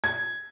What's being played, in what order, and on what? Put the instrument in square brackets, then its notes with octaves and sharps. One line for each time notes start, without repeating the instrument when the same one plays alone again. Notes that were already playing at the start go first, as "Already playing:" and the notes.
[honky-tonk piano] G#6